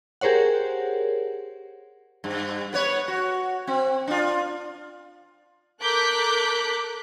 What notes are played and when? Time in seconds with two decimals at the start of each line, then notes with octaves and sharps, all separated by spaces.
0.21 G4 G#4 A#4 C5 C#5 F#5
2.24 G2
2.73 B3 B4 C#5
3.08 F#4
3.67 C4
4.07 D4 F4
5.81 A4 A#4 D6 F#6 G6 B6